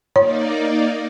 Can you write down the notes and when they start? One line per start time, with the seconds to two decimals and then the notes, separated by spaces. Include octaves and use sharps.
0.16 A#3 D#4 C#5 D5